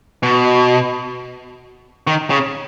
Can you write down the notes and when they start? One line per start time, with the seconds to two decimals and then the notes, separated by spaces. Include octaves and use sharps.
0.23 B2
2.07 D#3
2.30 C#3